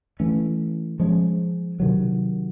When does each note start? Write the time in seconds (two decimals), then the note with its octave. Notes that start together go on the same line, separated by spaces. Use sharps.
0.20 E3 A3 C#4
1.00 F3 G#3 C#4
1.80 C3 D#3 F#3